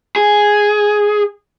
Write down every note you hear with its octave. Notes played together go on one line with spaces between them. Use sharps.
G#4